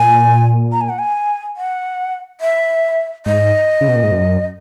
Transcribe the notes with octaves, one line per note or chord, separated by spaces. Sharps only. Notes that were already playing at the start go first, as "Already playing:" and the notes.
Already playing: A#2 G#5
A#5
G#5
F#5
G#5
F#5
E5
G#2 D#5
C#3
B2
A#2
G#2
F#2